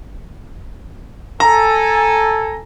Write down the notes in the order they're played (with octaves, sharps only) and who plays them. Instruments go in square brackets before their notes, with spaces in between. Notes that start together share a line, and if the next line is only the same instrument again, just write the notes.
[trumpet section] A4 G#5 [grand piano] A#5